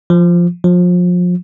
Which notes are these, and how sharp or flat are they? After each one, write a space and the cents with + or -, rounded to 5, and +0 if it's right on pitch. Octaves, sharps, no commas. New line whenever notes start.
F3 -5
F3 +30